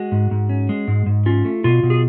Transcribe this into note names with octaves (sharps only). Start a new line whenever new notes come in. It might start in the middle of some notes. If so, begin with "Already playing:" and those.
Already playing: G#3 F#4
G#2
G#2
C#4
G#3
G#2
G#2
C#4 F4
A3
B2 F4
B2
G#4